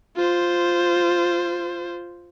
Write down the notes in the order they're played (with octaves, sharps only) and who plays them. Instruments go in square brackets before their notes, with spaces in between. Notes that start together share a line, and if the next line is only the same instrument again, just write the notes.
[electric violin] F4 C5